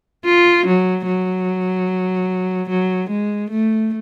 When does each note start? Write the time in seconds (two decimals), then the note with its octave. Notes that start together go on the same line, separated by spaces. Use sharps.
0.25 F4
0.67 F#3
1.06 F#3
2.70 F#3
3.10 G#3
3.51 A3